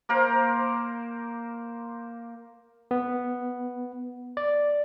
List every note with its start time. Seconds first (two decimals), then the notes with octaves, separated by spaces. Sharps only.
0.09 A#3 A#4 C5
2.91 B3
4.37 D5